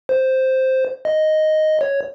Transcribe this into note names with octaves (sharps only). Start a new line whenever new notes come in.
C5
D#5
C#5